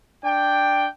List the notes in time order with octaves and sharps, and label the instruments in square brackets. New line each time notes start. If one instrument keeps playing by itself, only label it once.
[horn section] D4 G5